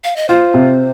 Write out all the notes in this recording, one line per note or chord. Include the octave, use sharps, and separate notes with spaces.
F5
D#5
F4 C5
C3